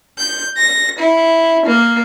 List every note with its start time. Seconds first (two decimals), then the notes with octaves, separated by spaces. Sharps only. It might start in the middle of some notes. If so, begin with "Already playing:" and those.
0.18 G6
0.57 A#6
0.98 E4
1.67 A#3